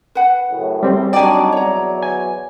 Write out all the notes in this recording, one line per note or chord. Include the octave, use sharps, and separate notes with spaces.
B4 F#5
F#2 A2 C#3
G3 C4
F#3 D4 D#4 D5 G5 G#5
E2 B2 F#3 C#5 A#5
G#5